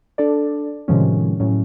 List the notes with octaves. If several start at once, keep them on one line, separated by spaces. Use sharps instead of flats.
D4 A4 D5
A2 C3 D#3 F3 G#3 C#4
A2 F#3 C#4